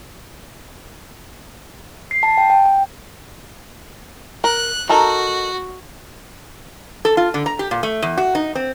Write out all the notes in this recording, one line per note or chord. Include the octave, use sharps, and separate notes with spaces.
C7
A5
G5
G5
G5
A#4 F#6
D#4 F#4 A4 A#4
A4
F4
D3
A#5
G4
A#2
A3
E2
F#4
D#4
C4